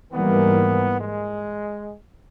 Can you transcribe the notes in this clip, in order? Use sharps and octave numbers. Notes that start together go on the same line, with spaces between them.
G#2 E3 G3 A#3 B3
G#3